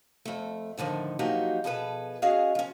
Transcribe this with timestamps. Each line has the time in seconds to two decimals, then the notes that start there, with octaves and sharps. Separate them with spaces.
0.25 F2 A3
0.78 A2 D3 D#3 F3
1.19 F3 F#3 A#3 D#4 F#4 G4
1.64 B2 F3 G#4 A4 B4
2.22 G#3 C#4 F#4 G#4 D#5 F5
2.55 F3 C#4